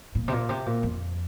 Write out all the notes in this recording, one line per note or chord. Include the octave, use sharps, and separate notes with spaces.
A#2
C3
A#2
C3
A#2
F2